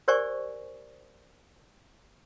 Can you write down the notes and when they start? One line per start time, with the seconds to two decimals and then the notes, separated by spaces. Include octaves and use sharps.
0.08 G4 A#4 C5 D5 G#5 C#6